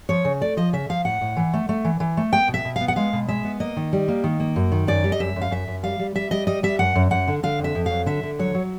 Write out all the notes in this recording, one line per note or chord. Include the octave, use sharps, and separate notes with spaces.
F3 C#5
C#3
A3 D5
F3 D#5
C#3 E5
F3 F5
A2 F#5
A2
E3
A3
A3
E3
E3
A3
B3 G5
B2
E5
B2
B3 F5
F#5
G#3 F5
B2
G#3 E5
B3
A#3 D#5
D#3
G3
A#3
D#3
A#3
F#2
D#3
F#2 D5
G3
D#5
F#2 E5
F#2
F5
F#2 E5
F#2
G3 F5
G3
G3 E5
G3 D#5
G3 D#5
G3 E5
F#2 F#5
F#2
F#2 F#5
D3
D3 F5
F2
E5
F2
F#3 F5
D3 E5
D3
F#3 C#5
F#3